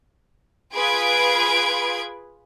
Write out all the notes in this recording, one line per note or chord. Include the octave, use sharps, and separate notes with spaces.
F4 G#4 B4 B5 G#6 D7